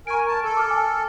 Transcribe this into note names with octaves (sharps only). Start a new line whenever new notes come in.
A#4 G#5 C#6 D7
A5
A4
D6 F6
G#5